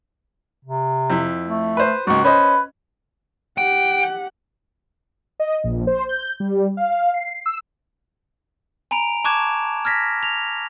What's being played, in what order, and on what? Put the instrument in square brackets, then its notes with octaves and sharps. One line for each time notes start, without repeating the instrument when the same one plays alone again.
[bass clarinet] C3
[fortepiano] F2 E4
[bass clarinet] A3
[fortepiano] B4 C5
[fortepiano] C#2 G#2 [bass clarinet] F#4
[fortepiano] C#4 C5 D#5 [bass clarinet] B4
[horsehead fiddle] G4 F#5 [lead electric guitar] G5
[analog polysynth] D#5
A#1
C5
G6
G3
F5
C7
E6
[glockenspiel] G#5 A#5 B5 D7 F7
A5 C#6 D6 F#6 G#6 E7
F6 G#6 A#6 B6
F7